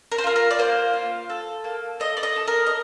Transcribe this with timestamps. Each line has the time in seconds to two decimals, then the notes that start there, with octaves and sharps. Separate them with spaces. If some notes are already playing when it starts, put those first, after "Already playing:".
0.12 A#4
0.18 C5
0.24 F4 A#4
0.36 A#4
0.51 D5
0.59 A#3 C5
0.93 F4
1.30 A4
1.64 A#3
2.00 A3 D#5
2.17 D5
2.23 D#5
2.36 A4
2.47 A#4
2.66 D#5